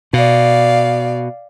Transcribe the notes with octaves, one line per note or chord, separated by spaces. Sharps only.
B2 D5 F5